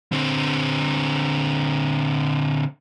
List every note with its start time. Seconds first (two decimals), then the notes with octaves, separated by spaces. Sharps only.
0.12 D3 C4